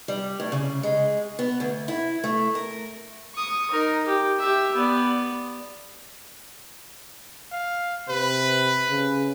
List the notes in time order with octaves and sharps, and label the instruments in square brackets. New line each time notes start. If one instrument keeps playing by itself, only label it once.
[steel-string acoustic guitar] G3
A2
C#3
G#3
B3
D2
E4
A3
A#4
[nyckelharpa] C#6 D#6
D#4 A#4
G4
G4 E5
B3 D5
[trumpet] F5
[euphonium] C3 [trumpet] B4
[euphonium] C#3